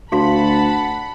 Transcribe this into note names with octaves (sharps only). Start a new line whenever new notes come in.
D2 F#4 F5 F#5 A5 B5 C6